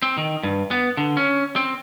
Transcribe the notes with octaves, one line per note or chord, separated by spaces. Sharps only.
C4
D#3
G2
B3
D3
C#4
C4